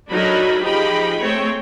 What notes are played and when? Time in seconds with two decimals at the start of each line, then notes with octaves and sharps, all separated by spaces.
0.10 F#3 D4 D#4 A4 A#4 B5
0.62 F3 D#4 G4 G#4 G5 B5
1.21 A3 C4 G#4 C#5 G5